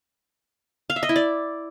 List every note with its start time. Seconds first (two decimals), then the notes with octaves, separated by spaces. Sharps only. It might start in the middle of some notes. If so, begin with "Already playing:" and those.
0.90 F5
0.96 E5
1.03 D#5
1.09 E4
1.16 D5